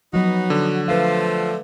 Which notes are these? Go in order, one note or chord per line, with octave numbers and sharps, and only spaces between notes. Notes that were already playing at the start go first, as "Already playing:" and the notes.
F3 F#3 B3 D#4 F#4
D3
F3 A3 B4 F5